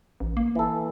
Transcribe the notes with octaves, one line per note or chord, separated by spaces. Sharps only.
A1
A#3
E3 A4